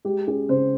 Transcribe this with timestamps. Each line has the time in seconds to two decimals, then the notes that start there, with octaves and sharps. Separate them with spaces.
0.05 G#3 G4
0.27 C#4 G#4
0.49 C#3 C5